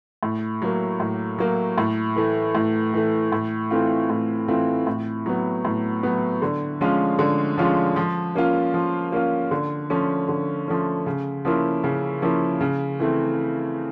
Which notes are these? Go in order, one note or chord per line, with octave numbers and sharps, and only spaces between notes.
A2
F#3 A#3
A2
F#3 A#3
A2
E3 A3
A2
E3 A3
A2
E3 A3 C4 F4
A2
E3 A3 C4 F4
A2
F#3 B3
A2
F#3 B3
D3
F3 G#3 C#4 F4
D3
F3 G#3 C#4 F4
F3
A#3 C#4 F4
F3
A#3 C#4 F4
D3
F3 A3 C#4
D3
F3 A3 C#4
C#3
F3 A#3 C#4 E4
C#3
F3 A#3 C#4 E4
C#3
E3 A3 C4